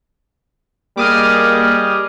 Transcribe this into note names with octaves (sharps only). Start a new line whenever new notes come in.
G3 A#3 G#4 D#5 D6 D#6 F6